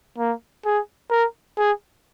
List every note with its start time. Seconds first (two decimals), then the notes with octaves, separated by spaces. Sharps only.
0.18 A#3
0.65 G#4
1.10 A#4
1.58 G#4